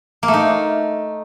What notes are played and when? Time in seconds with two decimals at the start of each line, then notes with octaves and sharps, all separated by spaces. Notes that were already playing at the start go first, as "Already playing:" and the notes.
0.23 A#3
0.28 A3
0.34 D#4